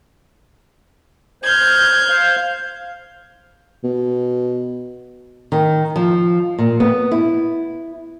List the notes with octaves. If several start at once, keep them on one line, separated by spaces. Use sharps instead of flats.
C5 F6 G6 G#6
C5 F5
B2
D#3
F3
A#2
B3
E4